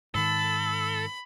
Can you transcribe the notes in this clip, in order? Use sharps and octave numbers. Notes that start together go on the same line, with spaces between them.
G#2 D#3 A4 B5